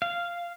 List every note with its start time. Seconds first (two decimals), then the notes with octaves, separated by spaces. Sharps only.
0.02 F5